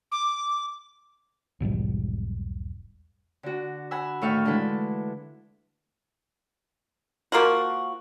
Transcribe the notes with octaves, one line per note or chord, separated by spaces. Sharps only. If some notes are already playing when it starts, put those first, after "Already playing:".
D6
E1 B1 G#2 G3
D3 F#4
F#5 G#5 B5 E6
A2 D#3 A4 E5 F5 C#6
D3 E3 G#3 A4 B4
F3 A#3 F4 F#4